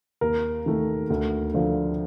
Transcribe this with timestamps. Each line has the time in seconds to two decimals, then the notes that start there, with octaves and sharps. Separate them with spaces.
0.21 D#2 A#4
0.66 D#3 A3
1.10 D2
1.54 D3 F3 A3